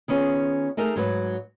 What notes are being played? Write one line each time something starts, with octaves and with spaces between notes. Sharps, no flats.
D#3 B3 C#4 F4 G#4
A3 D#4 G#4 A#4
G#2 F#3 B4